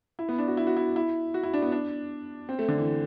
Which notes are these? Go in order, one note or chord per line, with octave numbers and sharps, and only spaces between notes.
E4
B3
D4
F#4
E4
F#4
E4
E4
F#4
E4
D4
B3
D4
C4
A3
D3
E3